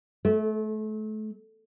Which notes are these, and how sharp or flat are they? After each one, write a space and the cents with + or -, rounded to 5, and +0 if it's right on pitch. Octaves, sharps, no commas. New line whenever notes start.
A3 -30